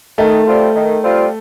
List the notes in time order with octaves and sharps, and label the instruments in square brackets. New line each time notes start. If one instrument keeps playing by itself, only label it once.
[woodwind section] D#3 [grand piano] A3
[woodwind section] G3 C4 F4
D#3
G3 C4 F4